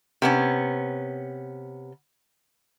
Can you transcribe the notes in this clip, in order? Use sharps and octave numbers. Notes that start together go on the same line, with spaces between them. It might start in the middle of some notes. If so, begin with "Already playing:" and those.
C3 B3 C#4